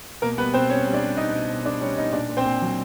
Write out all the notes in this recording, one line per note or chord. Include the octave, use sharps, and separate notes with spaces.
B2 A#3 A#4
G3 B3 B4
B2 C4 C5
G3 C#4 C#5
G3
D4 D5
G3
B2 D#4 D#5
B2
B2
G3 D4 D5
G3 C#4 C#5
B2 D#4 D#5
A#2 D4 D5
A#2
C4 C5
A#2
F#3